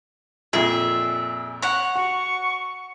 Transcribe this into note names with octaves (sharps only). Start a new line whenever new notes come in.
F2 A#2 G#4 E5
C#5 F#5
F#4 C#6